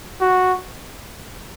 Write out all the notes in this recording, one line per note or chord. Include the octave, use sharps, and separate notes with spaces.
F#4